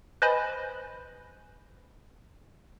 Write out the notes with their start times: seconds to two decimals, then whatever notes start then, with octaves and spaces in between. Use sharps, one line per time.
0.22 B4 C5 D#5 G#5 B5